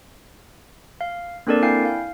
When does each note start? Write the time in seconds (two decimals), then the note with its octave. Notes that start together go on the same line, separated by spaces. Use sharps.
1.01 F5
1.47 A#3 C4 D4 A4 A#4 D5
1.62 E4 F5 G5 G#5 G6 C7
1.85 F5